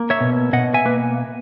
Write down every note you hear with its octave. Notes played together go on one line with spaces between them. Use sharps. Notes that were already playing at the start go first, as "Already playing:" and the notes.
Already playing: A#3
C#5 E5
B2
B2 D#5 F#5
E5 G#5
A#3 B4